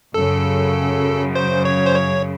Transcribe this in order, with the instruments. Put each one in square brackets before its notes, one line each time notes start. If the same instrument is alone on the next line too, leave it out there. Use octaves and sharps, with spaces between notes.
[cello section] F#2 C#3 F#3 [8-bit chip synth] A4
[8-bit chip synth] C5
C#5
C5
C#5